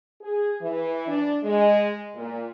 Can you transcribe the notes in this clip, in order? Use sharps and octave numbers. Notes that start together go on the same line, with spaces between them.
G#4
E3
D4
G#3
A#2